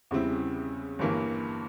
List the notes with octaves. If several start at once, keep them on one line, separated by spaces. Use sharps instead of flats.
E2 C#3 G3 C4 E4
G1 G2 E3 A#3